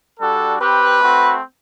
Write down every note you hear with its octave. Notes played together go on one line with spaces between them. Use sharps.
G3 D4 F#4 A4
C4 G4 B4
A3 C4 F#4